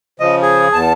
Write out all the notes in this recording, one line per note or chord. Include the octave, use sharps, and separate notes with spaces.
C#3 F3 D#5
G#4
E2 A5